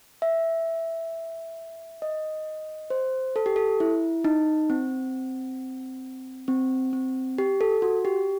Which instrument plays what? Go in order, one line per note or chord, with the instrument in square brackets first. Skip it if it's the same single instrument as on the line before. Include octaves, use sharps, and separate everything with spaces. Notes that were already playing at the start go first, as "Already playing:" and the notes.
[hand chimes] E5
D#5
C5
A4
G4
A4
E4
D#4
C4
C4
C4
G4
A4
F#4
G4